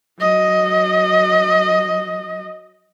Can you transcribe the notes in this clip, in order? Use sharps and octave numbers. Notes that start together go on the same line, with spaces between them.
F#3 D#5